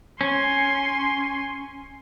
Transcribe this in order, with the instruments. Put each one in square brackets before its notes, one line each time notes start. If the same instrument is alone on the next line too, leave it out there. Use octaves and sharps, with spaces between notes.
[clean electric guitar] C#4 [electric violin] G#5 C6